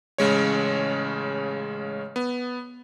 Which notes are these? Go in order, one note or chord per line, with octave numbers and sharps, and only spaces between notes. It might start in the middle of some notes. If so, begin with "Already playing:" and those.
A1 C#3 G#3 C#5
B3